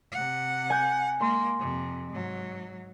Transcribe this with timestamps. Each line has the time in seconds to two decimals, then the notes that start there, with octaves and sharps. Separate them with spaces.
0.12 C3 F#5
0.70 G#5 G6
1.21 G#3 A#3 C6
1.59 F2 C3
2.09 G#2 F#3